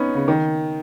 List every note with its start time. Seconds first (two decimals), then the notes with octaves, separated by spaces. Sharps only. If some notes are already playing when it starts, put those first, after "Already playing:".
Already playing: B3 C#4 D#4
0.15 C#3
0.28 D#3